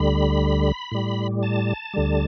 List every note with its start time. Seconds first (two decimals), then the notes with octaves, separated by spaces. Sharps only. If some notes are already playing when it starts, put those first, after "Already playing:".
Already playing: D2 D3 G3 B5
0.92 A2 G3
1.43 A5
1.94 D2 D3 G3